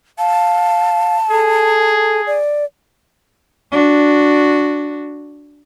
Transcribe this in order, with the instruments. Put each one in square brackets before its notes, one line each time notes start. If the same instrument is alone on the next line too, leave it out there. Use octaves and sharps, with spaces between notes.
[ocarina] F5 [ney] A5
[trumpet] G#4 [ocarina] A4
[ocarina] D5
[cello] D4 F#4